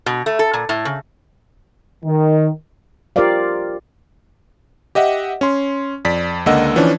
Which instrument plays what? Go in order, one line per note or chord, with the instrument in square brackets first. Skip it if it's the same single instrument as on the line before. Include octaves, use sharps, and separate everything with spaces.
[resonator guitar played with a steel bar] B2
A3
A4
A#2
A2
C#3
[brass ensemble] D#3
[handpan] F4 G4 A#4 C5 D5 F5
[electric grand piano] G4 D#5 E5 F#5
C#4 C6
F2 D5 B6
C#2 D3 A#3 D#5 F#5 E6
E3 F3 C#4 D4